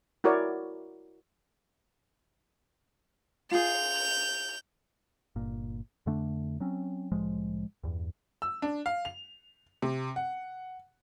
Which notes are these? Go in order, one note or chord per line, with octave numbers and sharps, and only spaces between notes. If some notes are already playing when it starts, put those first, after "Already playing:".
E4 F#4 A#4 C#5 D5
F4 G#4 G6 F7
G1 A#2
F2 D3 A3 D4
F#3 C4 C#4
C2 A2 F3 G#3
E2 G2
E6
D4
F5
F7
C3
F#5